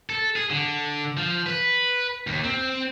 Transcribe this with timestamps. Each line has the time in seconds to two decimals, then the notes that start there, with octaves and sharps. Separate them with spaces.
0.10 A4
0.36 G#4
0.50 D3
1.17 F3
1.46 B4
2.27 D#2
2.44 C4